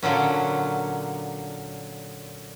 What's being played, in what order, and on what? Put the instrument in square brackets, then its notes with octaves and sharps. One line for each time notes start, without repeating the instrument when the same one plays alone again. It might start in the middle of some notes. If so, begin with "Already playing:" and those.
[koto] A#2 D3 F#3 C#4